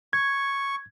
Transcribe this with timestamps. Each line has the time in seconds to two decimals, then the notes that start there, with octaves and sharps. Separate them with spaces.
0.13 C#6 G#6